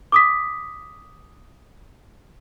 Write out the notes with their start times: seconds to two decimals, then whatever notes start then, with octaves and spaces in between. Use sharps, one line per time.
0.12 D6 D#6 B6